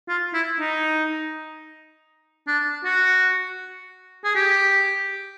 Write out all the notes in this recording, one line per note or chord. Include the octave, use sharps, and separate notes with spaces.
F4
E4
D#4
D4
F#4
G#4
G4